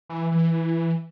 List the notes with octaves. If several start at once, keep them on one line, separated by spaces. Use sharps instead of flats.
E3
E3